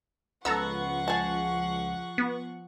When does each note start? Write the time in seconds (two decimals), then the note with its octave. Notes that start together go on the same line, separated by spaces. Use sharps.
0.45 C#2 F3 B3 A4 F#5 A#5 C#6 E6
1.08 G#4 A5
2.18 B3